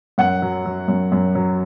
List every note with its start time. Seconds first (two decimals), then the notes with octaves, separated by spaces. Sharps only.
0.18 F#2 F#5
0.42 F#3
0.66 F#3
0.88 F#2
1.12 F#2
1.35 F#3